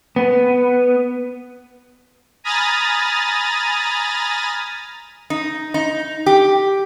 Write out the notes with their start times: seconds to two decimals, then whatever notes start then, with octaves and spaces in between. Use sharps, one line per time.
0.16 B3
2.44 G#5 A#5 B5 D#6 F6 A6
5.30 D#4
5.74 D#4
6.26 G4